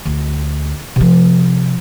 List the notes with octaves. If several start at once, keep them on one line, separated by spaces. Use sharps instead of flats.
D2
C3 F3